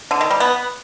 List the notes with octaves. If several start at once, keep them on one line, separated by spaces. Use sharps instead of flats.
D3
D#3
G3
B3